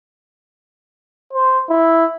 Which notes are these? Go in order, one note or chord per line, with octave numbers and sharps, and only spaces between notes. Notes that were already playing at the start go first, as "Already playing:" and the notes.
C5
E4